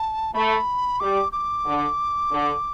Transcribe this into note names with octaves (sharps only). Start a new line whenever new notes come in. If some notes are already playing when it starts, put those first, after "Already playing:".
Already playing: A5
A3 B5
G3 D6
D6
D3
D3